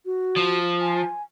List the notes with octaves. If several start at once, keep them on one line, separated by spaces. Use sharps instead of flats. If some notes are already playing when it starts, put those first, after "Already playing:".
F#4
F3
G#5